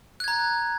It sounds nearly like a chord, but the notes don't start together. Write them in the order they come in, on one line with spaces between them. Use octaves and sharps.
F#6 G#6 A#5